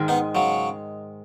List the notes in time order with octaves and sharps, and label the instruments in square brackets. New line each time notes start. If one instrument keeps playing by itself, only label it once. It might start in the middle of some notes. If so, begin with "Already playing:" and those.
Already playing: [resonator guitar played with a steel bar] G#2 D#3 G#3
[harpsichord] B3 D#4
C#3 F#3